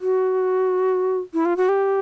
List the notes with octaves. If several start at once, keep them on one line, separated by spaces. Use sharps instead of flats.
F#4
E4
F4
F#4
G4